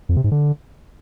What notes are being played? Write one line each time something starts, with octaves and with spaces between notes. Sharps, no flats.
F2
C3
G#2
D3